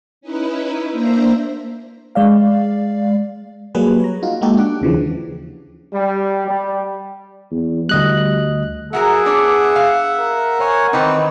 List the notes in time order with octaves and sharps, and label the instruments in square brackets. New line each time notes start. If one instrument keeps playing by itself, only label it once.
[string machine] C#4 D#4 E4 B4
A#3 D4 C5 E5 A#5
[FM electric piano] G#3 D5 F5
F#3 G3 A#3 G#4 B4
C#5 A#5
D#4 F4 F#4
G#3 A#3 D#4 F#4 G4 A4
D4 G4 F#5 D6
D#2 C#3 E3 F3
[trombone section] G3
G3
[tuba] E2
[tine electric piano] D2 D#5 F#6 [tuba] G3
[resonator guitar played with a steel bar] F#3 F#4 A#4 [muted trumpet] G#4 [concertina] E5 F#5
[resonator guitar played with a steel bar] B3 D4 C#5
F5
[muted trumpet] A#4
[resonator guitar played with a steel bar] C5 [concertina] C#5 F#5 G#5
[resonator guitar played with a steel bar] D#3 E3 D#4 [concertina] C4 B4